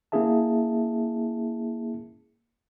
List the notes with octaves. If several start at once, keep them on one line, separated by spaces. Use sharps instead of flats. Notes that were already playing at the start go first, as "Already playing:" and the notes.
A#3 C#4 E4 G#4 E5 A5